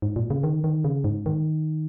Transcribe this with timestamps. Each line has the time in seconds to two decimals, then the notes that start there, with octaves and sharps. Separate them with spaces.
0.02 G#2
0.16 A#2
0.30 C#3
0.43 D#3
0.64 D#3
0.84 C#3
1.04 G#2
1.26 D#3